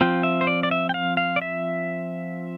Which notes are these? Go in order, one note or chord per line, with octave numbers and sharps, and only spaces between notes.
F3 C4 F4 G5
E5
C5
D5
D5
E5
G5
F5
F5
D5
E5